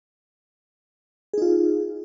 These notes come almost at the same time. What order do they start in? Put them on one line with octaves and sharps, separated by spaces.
G#4 D#4 F4